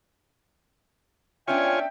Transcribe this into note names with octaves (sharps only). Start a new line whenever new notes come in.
B3 C#4 D4 F4 C#5 E5 G5 G#5